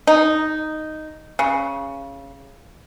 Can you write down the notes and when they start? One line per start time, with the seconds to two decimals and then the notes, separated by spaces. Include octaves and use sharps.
0.07 D#4
1.39 C#3